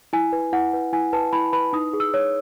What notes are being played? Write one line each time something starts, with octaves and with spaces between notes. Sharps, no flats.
E4 G#5
B4
E4 F#5
B4
E4 G#5
B4 A5
E4 B5
B4 B5
D#4 D#6
G#4
E6
C#5